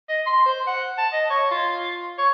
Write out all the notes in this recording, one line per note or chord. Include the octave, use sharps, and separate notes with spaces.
D#5
C6
C5
F#5
A5
D#5
C#5
F4
C#5